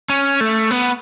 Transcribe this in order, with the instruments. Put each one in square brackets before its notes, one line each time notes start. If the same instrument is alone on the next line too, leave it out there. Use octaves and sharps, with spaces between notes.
[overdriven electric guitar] C#4
A3
B3